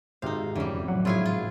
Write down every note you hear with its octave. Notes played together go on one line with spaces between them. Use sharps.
G#1 C3 D#4 C5 F5
F2 D3 E3 G3 C#4
A2 C3 F3 F#3 F#5
G#1 E4 F4 G#4 C#5 G#5
F4